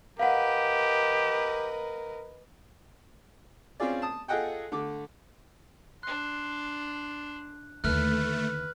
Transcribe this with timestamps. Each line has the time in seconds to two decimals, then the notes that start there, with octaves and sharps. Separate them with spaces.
0.19 G4 A#4 B4 D#5 F5 F#5
3.80 C4 C#4 F4 G#4 D5
4.02 A5 D#6
4.28 F4 G#4 A4 D#5 F#5 G5
4.72 D3 A3 D6
6.03 D4 C6 F#6
7.84 D#2 D3 A3 B4 F6 F#6